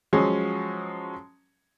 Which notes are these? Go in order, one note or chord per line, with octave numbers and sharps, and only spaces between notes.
F3 F#3 G#3 C#4